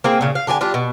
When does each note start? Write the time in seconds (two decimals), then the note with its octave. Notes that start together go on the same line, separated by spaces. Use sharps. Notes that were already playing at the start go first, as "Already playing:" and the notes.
0.04 A#3 C4 G#4
0.21 A#2 C#3
0.35 F5
0.47 D3 G4 G#4 G#5
0.61 G3 D4 F4
0.74 B2